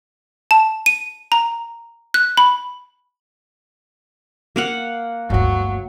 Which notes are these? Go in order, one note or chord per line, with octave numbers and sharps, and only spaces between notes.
A5
D#7
A#5
F#6
B5
A#3 F5 F#5
G1 D2 F#3